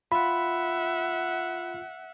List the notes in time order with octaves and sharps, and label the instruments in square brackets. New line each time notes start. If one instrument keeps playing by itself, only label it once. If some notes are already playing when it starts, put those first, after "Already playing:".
[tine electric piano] F4 [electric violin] E5 F#5 [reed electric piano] B5